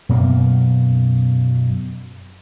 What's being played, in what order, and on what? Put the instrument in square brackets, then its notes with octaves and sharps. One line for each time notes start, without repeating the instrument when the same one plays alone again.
[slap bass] F#2 B2 A#3